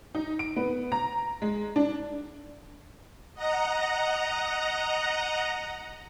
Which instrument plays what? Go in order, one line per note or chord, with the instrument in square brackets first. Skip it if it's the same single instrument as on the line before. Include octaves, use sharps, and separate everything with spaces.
[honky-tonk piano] D#4
D7
B3
A#5
G#3
D4
[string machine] D#5 F#5 A#5